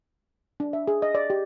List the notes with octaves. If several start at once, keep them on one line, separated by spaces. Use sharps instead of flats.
D4
E5
G#4
D#5
D5
G4